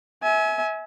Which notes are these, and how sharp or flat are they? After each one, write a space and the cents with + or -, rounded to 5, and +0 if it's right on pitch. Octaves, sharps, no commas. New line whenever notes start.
E5 -25 G#5 +20